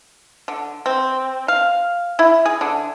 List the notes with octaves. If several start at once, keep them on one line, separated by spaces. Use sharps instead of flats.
D3
C4
F5
E4
G#4
D3